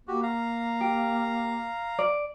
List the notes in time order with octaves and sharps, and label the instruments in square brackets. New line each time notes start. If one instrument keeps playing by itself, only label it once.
[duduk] A#3 [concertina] F#4 G4
[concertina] F5 A#5
[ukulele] G4
D5